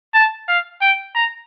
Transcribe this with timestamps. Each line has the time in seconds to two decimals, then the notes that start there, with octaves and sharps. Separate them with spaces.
0.14 A5
0.48 F5
0.81 G5
1.15 A#5